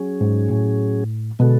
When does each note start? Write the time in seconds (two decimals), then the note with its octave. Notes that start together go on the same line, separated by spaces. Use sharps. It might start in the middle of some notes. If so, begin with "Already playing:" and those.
Already playing: F#3 C#4 G#4
0.21 G#2
0.50 A2
1.39 B2 D3 G#3 B3 F#4 A4